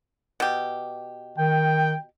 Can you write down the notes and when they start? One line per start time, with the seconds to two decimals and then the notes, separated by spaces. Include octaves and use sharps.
0.40 B2 G4
1.38 D#3 G5